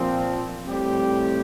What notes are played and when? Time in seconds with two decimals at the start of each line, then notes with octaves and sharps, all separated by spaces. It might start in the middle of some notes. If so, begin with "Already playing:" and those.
Already playing: A#2 F3 C4
0.67 A2 G3 C4 G4